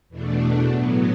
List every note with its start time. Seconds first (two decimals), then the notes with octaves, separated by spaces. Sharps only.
0.09 E2 B2 A3 D4
0.66 A2 F#3 B3